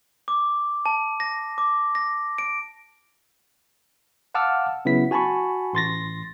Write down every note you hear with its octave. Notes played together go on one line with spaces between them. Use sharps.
D6
A5
A#6
D6
A#6
D7
F5 F#5 A5 D6 E6 F6
C#3 F#3 B3 E4 B6
F#4 G#5 A5 B5 C#6
A1 C6 A6 A#6